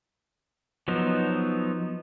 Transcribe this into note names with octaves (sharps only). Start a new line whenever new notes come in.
F3 F#3 B3 D#4